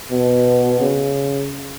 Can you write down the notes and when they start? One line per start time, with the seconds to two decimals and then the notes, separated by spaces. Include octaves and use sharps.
0.11 B2
0.80 C#3